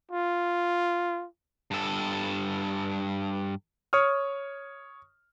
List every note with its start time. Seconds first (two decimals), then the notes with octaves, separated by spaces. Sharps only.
0.11 F4
1.71 G2 A4
3.93 C#5 C#6 D#6 F6